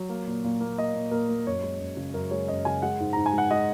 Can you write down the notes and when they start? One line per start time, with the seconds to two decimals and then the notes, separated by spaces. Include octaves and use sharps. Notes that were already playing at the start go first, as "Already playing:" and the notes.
Already playing: F#3
0.09 A#3
0.27 A#2
0.44 A#2
0.61 A#3
0.78 A#3 D#5
0.94 A#2
1.11 A#2 A#4
1.29 A#3
1.47 F#2 C#5
1.63 G#3
1.81 F#2
1.97 C#3
2.14 F#2 A#4
2.31 G#3 C#5
2.48 F#2 D#5
2.65 C#3 G#5
2.82 G#3 F#5
3.00 G#2
3.13 G#2 A#5
3.26 G#5
3.33 G#3 F#5
3.51 G#3 D#5